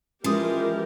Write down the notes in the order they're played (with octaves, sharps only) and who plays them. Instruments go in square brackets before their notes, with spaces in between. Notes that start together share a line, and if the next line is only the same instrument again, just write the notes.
[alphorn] E3 [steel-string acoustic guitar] F3 G#3 [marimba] C#4 D#6 [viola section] G4 A#4